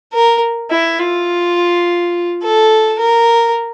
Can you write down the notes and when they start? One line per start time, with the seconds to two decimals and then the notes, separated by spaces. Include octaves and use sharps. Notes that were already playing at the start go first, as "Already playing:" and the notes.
0.13 A#4
0.70 E4
0.98 F4
2.42 A4
2.99 A#4